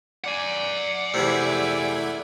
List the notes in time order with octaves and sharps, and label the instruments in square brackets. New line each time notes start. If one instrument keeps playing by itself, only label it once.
[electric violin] D5 [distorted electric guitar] F#5 G#5
[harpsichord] E2 C3 [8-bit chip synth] A3 E4 G#6